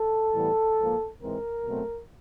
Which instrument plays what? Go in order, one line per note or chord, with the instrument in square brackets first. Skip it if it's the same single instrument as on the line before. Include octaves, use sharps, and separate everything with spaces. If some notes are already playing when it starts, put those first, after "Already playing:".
Already playing: [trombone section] A4
A2 E3 G3 B3
G#2 F3 A#3
G#2 E3 G#3 C4 A#4
B2 F#3 A3 C4